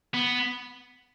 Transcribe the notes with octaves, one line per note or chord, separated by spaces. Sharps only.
B3